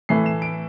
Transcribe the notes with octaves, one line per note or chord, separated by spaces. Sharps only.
A2 E3 A3 C7
E7
D7